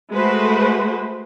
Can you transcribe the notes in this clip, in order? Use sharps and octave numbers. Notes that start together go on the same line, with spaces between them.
G#3 A3 F#4 B4 C5